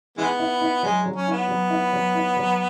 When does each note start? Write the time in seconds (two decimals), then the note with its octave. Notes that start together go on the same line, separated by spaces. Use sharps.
0.18 E3 G#3 B3 E4
0.39 E4
0.61 E4
0.83 F#3 G#3
1.06 F#3
1.16 C#4
1.27 B3 E4
1.48 F#3
1.70 E4
1.93 F#3
2.15 E4
2.37 F#3